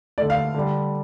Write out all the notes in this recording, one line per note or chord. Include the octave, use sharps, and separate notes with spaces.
D3 A3 D5
F5
D3 G3